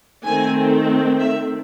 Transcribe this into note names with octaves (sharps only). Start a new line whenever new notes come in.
D#3 A3 C4 G#5
E5